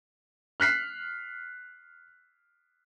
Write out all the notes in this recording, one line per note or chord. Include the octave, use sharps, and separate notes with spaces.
F6 F#6 B6 C7